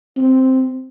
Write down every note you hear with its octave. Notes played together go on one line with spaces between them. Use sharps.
C4